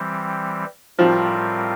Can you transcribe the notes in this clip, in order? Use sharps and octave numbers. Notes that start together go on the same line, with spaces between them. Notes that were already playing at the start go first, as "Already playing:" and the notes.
Already playing: E3 G3 C4
A2 F3 G3 C4 F4 A#4